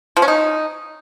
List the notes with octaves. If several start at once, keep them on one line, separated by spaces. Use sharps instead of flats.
F3
C#4
D#4